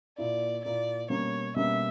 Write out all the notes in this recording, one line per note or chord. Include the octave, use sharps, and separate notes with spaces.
A#2 A#3 E4 D5
A#2 A#3 E4 D5
B2 G3 A#3 C#4 C#5
B2 G3 A#3 C#4 E5